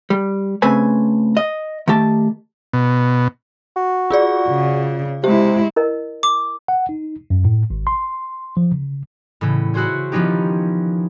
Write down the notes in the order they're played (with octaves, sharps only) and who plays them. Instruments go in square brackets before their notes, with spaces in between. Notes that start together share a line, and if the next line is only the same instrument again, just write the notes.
[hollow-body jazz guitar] G3
C#3 A3 C4 B4 G#5
D#5
D#3 A3 G4 A5
[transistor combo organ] B2
[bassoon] F#4
[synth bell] F4 G#4 D5
[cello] C#3
[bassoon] C3 [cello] G#3 E4 [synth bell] G4
[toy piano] E4 A#4 D#5
[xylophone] D6
[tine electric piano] F#5
D#4
F#2
A2
G#1
C6
F3
C#3
[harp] A2 C#3 E3 C#4
E4 F#4 G#4 C5 C#5
D#3 F3 B3 C#4 D#4 G4